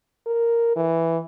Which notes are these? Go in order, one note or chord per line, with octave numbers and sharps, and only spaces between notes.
A#4
E3